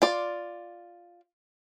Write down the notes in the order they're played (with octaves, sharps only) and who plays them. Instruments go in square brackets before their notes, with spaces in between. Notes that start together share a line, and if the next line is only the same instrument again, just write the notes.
[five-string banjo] F4 D5